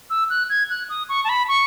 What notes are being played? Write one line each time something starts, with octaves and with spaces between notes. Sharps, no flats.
E6
F#6
G#6
F#6
D#6
C#6
A5
B5
C#6